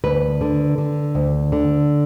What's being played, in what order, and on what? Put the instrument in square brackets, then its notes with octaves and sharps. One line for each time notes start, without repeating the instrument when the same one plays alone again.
[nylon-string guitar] D2 B4
D3
D3
D2
D3